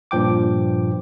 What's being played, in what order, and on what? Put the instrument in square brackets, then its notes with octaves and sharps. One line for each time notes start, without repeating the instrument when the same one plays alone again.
[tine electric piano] G2 A#2 F3 G5 D6